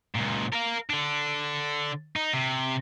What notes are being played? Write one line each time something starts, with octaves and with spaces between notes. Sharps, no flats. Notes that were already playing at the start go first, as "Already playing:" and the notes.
C#2 A#2
A#4 F5
D3 D4
D#4
C3